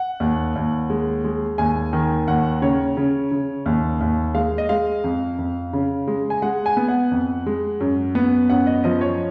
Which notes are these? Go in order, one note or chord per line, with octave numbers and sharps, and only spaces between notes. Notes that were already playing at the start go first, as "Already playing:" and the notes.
Already playing: F#5
D#2
D#2
G#3
G#3
D#2 G#5
D#3
D#2 F#5
C#3 C#5
C#3
C#3
D#2
D#2
G#3 F5
D#5
G#3 F5
F2
F2
C#3
G#3
G#5
G#3 F#5
G#5
B3
F#5
F2
G#3
F#2
B3
F#2 F#5
D#5
F3 D#5
C#5